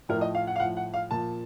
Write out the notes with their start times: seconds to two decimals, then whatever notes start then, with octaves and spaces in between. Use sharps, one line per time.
0.09 A2 A#4
0.13 F3
0.21 D#5
0.35 F5
0.47 F#5
0.56 F5
0.60 A2 F3 F#5
0.77 F#5
0.94 F5
1.11 A#2 F3 A5